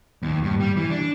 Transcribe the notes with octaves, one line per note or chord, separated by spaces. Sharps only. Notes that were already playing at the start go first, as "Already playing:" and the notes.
D#2
G2
G3
E3
D4